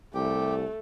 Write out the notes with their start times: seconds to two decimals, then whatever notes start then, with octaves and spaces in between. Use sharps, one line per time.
0.14 C2 A3 G4